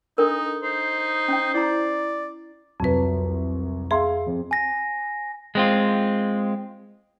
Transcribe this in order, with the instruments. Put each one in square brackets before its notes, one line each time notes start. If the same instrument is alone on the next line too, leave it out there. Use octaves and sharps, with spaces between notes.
[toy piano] D4 A4 A#4 [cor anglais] D#4
[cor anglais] D#4 [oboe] C5
[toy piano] C#4 G5
[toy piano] E4 A#5 [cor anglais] D5
[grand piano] C2 F#3 [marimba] F2 B4
[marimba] G#4 [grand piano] E5 F5 C6
[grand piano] F2
[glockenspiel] G#5 A#6
[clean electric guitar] G#3 C4 F4